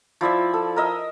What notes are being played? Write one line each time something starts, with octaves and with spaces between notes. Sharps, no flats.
F3 E4 D5 E5
A4
A#4 D#5 E5